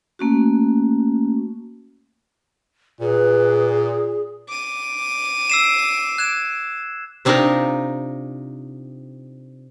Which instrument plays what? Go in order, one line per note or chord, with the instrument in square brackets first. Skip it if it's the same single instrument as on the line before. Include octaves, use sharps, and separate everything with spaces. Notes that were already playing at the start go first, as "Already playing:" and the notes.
[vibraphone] A3 A#3 C#4 F#4
[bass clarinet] A#2 [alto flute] G#4 [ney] B4
[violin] D6 D#7
[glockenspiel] E6 C7 E7
F#6 G#6 E7
[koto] C3 C4 D4 D#4 F4 A#4